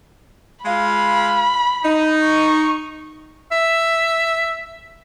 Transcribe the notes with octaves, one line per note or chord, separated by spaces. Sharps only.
G#3 F4 F5 B5
D#4
C#6
E5